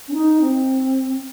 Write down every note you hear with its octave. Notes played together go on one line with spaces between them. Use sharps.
C#4
D#4
C4